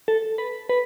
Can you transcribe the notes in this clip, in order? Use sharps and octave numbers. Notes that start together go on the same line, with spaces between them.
A4
B4
B4